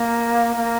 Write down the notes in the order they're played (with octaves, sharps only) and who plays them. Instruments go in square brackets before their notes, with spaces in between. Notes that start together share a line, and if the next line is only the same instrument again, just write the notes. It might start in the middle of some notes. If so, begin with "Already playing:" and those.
Already playing: [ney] A#3
A#3